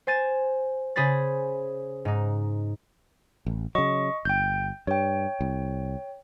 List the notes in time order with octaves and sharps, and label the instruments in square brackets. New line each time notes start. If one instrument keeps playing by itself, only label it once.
[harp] C5 G#5 A6 D#7 E7
C#3 G#4 C5 B5 A6
G#2 D#4
[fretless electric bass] A1
[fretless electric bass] C#3 F#3 [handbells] D#5 C#6
[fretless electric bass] G1 [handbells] G5 G6
[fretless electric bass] G2 [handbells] C#5 G5
[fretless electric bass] C2